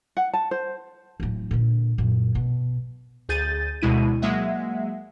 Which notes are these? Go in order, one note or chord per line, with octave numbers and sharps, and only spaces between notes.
F#5
A5
C5
D1 E2
A#2 D3
F#2 A#2
B2
D2 G#4 G6 A6 D#7
D2 B2 G#3 E4 D#7
F#3 G#3 A#3 E5 F#5